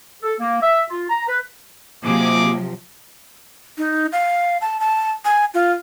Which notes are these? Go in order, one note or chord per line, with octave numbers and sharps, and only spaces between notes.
A4
A#3
E5
F4
A#5
B4
C3 F3 F#3 G#3 A#3 G#4 D6
D#4
F5
A5
A5
G#5
F4